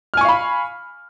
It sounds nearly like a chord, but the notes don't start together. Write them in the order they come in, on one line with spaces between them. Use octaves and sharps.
F6 G#5 C#6 F5 B5